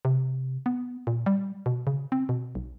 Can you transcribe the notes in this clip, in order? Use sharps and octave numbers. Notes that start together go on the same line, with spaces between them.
C3
B3
A#2
G3
B2
C#3
C4
B2
B1